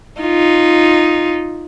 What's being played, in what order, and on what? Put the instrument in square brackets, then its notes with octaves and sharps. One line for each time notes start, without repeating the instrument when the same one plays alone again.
[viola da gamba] D#4 F4